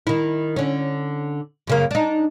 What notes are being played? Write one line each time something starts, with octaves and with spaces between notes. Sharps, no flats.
D#3 E4
D3 C#4
F#2 C#3 A#3
D4 D#4